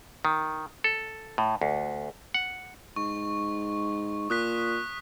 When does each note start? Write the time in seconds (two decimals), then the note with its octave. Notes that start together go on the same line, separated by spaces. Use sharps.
0.25 D#3
0.84 A4
1.38 A2
1.62 D2
2.34 F#5
2.96 G#2 C#6
4.30 A#2 D#6 F#6 B6